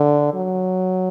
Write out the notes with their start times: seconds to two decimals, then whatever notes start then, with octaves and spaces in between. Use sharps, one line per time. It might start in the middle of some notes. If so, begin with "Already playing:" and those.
Already playing: D3
0.34 F#3